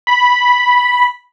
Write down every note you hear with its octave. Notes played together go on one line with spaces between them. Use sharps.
B5